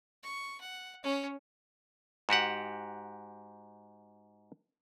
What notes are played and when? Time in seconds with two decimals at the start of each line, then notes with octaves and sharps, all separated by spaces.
0.23 C#6
0.61 F#5
1.03 C#4 C#5
2.29 G#2 F#4 G4 F#5